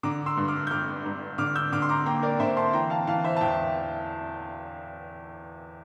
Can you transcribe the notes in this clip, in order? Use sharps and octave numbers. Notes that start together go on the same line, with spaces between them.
D3 A#5 D6
C6 E6
G2
D6 F6
G6
G1 D6 F6
G2
D3 D6 F6
E6 G6
D3 D6 F6
C6
A#5 D6
A#3 G5 A#5
A#4 D5
D3 C5 E5
A5 C6
E3 G5 A#5
F5 A5
E3 F5 A5
C5 E5
A5
E2 E5 G5